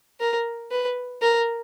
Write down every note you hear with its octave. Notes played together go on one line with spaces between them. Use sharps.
A#4
B4
A#4